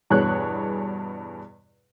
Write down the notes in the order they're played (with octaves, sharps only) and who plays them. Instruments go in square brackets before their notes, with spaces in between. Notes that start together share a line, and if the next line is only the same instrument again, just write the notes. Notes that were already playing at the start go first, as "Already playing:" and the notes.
[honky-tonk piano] E2 G2 B2 G#4 C#5 F#6